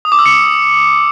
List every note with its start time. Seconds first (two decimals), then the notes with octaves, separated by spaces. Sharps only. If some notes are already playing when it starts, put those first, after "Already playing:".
0.05 D#6
0.12 D6
0.19 E6
0.26 C#7